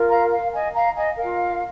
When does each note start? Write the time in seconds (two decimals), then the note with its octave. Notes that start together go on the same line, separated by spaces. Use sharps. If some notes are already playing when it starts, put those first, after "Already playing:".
Already playing: F4 A#4
0.09 F5 A#5
0.31 F5
0.53 D#5 G#5
0.74 F5 A#5
0.95 D#5 G#5
1.16 F4 A#4 F5